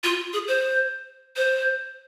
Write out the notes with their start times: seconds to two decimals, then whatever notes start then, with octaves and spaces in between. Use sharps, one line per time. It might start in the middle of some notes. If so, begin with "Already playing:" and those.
0.04 F4
0.33 G#4
0.48 C5
1.36 C5